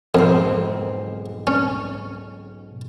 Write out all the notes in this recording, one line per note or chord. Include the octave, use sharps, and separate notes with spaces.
B1 F2 G#2 C4
C#4